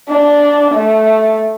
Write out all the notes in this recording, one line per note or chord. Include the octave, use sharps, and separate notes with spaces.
D4
A3